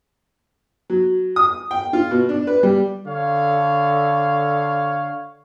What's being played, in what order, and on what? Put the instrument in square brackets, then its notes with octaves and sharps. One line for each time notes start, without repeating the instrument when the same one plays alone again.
[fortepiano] F#3
D#6
G5
F4
B2
D4
B4
G3
[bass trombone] D3 [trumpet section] C#5 F5